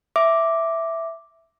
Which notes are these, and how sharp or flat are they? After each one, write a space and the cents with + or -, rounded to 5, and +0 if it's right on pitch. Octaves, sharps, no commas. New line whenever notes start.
E5 +0 D6 +0